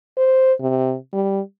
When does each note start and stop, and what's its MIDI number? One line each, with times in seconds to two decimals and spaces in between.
0.18 0.53 72
0.61 0.96 48
1.13 1.41 55